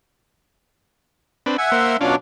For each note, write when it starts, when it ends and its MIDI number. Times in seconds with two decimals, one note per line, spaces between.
1.46 1.57 60
1.46 1.57 62
1.46 1.57 71
1.58 1.96 76
1.58 1.96 78
1.58 1.70 80
1.72 1.97 58
1.72 1.97 72
2.01 2.15 47
2.01 2.15 54
2.01 2.16 61
2.01 2.15 62
2.01 2.16 65
2.01 2.16 74